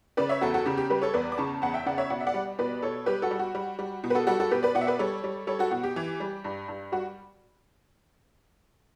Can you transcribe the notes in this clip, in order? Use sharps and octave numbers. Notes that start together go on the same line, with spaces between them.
C#3 B4 D5
C#5 E5
E2 F#4 A4
F#4 A4
C#3 G4
G4
G3 G4 B4
A4 C#5
E2 B4 D5
D6
C#3 A5 C#6
E2 F#5 A5
E5 G5
C#3 D5 F#5
C#5 E5
B2 D5 F#5
E5
D5 F#5
G3
B2 B4 D5
B2 A4 C#5
G3 G4 B4
F#4 A4
G3
F#4
G3
G3
B2
B4
F#4 A4
G3 F#4 A4
F#4 A4
B2 G4 B4
B4 D5
B2 D5 F#5
E5
B4 D5
G3 A4 C#5
G3
G3 A4 C#5
F#4 A4
B2 F#4
G4
E3
G3
G2
G2
G3 F#4